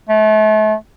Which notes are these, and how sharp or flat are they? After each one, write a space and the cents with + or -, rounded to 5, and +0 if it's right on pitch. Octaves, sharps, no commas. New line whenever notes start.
A3 -35